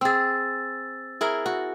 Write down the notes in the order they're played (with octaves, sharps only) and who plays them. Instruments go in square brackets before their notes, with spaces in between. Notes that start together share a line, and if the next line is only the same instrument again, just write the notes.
[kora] C4 G#4 [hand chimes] E6 A6
[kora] E4 G#4 A#4
F#4